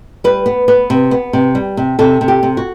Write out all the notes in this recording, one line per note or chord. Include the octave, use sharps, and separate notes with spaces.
G3 B4
B3
B3
C3
B3
C3
G3
C3
C3 A4
C3
G4
C3
F#4